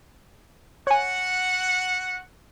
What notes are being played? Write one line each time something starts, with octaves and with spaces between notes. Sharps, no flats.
F#4 C#5 F#5 G#5